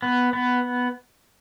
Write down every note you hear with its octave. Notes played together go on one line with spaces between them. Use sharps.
B3
B3